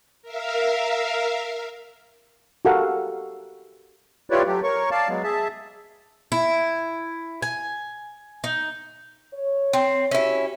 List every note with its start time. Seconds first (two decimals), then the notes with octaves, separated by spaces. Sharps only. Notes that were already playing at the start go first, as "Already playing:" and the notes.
0.22 A#4 E5 F5
2.65 F#4 G4 A4 A#4 F5 F#5
4.30 E4 F4 G4 B4 C#5 D5
4.46 F#3 A3 G4
4.63 A#4 C#5 C#6
4.91 D5 F5 A5
5.09 F#3 G#3 B3
5.24 G#4 E5 A5
6.32 E4
7.42 G#5
8.44 D#4
9.34 C#5
9.73 C4
10.11 C#4 E4 F#4 G4 E5